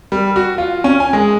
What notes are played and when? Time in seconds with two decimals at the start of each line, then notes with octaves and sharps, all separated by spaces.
0.12 G3
0.36 F#4
0.58 F4
0.84 C#4
1.00 G#5
1.13 G#3